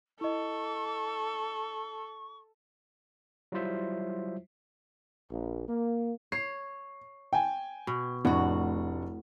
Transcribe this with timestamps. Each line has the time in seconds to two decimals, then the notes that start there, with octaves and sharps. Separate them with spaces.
0.21 E4 A4 D#5 C#6
3.52 F#3 G3 E4 F4 C5 E5
5.31 A#1
5.68 A#3
6.32 C#5 C7
7.33 G5 G#5
7.87 B2
8.25 F1 A2 D4 F#4 F#5